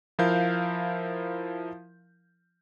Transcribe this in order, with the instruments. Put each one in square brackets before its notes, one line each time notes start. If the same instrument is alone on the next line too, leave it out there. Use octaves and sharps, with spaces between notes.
[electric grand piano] F3 E4 A#4 F5 G6